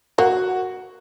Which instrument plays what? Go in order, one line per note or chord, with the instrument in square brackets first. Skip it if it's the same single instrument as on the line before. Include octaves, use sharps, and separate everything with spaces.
[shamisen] A#3 [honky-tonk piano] F#4